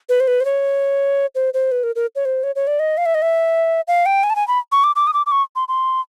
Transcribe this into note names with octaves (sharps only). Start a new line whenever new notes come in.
B4
C5
B4
C5
C#5
C5
C5
B4
A#4
A#4
C#5
C5
C#5
C#5
D5
D#5
F5
E5
D#5
E5
F5
G5
G#5
A5
G#5
B5
C#6
D6
D6
D#6
D6
D6
C#6
C6
C6